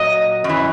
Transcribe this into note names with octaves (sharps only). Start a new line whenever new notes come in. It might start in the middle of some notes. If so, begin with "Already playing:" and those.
Already playing: A#2 F#3 D#5
F#2
E3